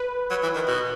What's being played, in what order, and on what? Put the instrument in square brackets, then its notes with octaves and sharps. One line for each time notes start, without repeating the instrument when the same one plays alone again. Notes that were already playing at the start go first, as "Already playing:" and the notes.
Already playing: [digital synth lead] B4
[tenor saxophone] F#3
E3
D#3
B2